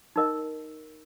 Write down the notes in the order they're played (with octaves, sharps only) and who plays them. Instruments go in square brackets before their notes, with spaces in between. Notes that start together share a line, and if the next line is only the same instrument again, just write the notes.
[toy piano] D#4 A#4 D#5